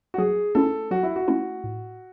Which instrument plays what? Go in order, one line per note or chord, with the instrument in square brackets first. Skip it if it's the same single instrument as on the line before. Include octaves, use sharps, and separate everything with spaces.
[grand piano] F#4
[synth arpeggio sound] F#3 [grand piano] G#4
[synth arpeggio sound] A3 C#4 E4 [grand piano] A4
[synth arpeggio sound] F#3 [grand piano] F#4
[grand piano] E4
F#4
[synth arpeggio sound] A3 C#4 E4
A2